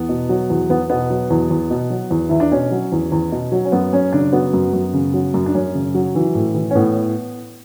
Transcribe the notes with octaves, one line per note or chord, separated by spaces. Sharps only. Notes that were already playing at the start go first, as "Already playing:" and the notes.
Already playing: E2 B3
B2
F#3
E2
E2 B3
B2 B3
F#3
E2
E2
B2
F#3
E2
E2 E4
D4
B2 C#4
F#3
E2
E2
B2
F#3
C#4
F#2 B3
F#2 C#4
C#3 D4
F#3 B3
F#2
F#2
C#3
F#3
F#2
D4
F#2 C#4
C#3
F#3
E3
A2
E3
C#4
A2 B3